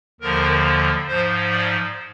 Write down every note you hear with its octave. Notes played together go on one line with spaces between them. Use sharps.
D#2 D3 F3 A#4
G#2 F3 C5
D5